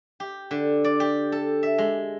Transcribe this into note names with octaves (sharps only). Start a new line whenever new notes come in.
G4
D3
D5
G4
A4
E5
G#3